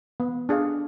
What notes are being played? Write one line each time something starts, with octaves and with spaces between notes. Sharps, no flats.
B3
D4 G#4 D5 F5